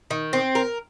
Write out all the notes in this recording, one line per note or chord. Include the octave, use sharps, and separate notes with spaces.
D#3
C4
A#4